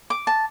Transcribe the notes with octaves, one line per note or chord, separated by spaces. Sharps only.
D6
A5